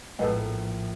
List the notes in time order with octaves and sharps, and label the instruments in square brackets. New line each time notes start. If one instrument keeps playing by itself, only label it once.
[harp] A#1 A2 [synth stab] G#3 B3 A4